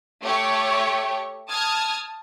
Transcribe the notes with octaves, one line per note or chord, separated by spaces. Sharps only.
A3 G4 C#5
A5 D#6 F6 G#6